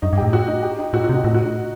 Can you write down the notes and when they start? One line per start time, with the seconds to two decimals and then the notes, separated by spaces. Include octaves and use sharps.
0.02 F#2 D#4
0.13 G2
0.18 G4
0.23 A2
0.33 F#4
0.48 D#4
0.63 G4
0.79 D#4
0.93 A2 F#4
1.04 F#4
1.09 C3
1.14 D#4
1.24 A2 F#4
1.34 F#4
1.45 D#4